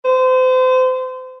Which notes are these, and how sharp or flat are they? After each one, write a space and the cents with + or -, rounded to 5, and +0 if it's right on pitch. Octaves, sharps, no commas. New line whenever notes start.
C5 -35